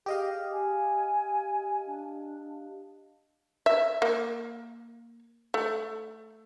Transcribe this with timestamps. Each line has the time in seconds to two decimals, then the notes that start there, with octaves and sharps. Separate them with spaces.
0.06 G4 G#4 D#5 F5
0.52 G#5
1.86 D4
3.66 E5
4.02 A#3
5.54 A3